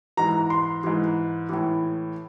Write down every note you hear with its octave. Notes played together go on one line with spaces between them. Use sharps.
G#2 E3 A#5
C6
G#2 E3
A2 E3